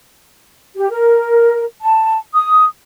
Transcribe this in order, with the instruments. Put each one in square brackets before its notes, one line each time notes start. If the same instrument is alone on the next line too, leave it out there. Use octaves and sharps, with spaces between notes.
[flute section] G4
A#4
A5
D#6